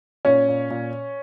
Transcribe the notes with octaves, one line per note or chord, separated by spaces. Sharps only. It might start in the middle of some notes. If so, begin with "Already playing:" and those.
A#2 C#4 C#5
A#2
A#2